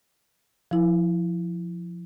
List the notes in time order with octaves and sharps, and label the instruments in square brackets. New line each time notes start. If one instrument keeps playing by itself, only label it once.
[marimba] F3 E4